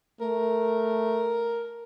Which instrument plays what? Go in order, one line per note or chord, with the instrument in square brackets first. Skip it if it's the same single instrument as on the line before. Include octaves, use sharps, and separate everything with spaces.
[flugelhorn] A3 [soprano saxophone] A#4